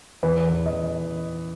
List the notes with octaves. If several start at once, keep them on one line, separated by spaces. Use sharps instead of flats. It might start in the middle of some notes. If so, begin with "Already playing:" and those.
E2 B4
E3
D#5